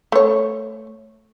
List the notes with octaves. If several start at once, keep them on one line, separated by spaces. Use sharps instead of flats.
A3 C#5